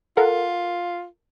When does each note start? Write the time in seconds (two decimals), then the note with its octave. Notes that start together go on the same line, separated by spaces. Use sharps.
0.17 F4 A4 A#4 F#5